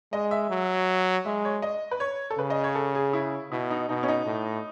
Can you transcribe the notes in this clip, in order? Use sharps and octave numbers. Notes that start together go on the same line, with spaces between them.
G#3 D#5
E5
F#3
G#3 E5
C#5
D#5
B4
C#5
A4
C#3 B4
D#5
C#5
A4
G#4
E4
B2 E4
D#4
B2 D#4
C#4
D#4
A2